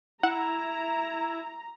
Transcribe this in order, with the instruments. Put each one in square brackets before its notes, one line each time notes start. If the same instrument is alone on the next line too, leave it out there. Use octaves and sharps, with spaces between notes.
[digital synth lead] E4 [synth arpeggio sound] F#5 [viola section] A#5